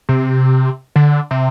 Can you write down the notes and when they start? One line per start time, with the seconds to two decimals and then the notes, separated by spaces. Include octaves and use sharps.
0.09 C3
0.96 D3
1.31 C3